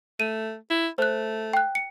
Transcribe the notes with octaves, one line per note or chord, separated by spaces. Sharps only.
A3 D#7
E4
A3 C5 F#6
G5 F#6
C#7